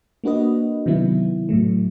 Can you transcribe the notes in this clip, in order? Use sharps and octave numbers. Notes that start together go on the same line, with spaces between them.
A#3 D4 F#4 B4 D#5
C3 D#3 F#3 B3 E4
A2 F#3 A3